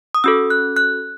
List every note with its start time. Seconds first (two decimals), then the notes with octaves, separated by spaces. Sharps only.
0.15 D#6
0.24 C#4 F#4 A4 E6
0.50 F#6
0.77 F#6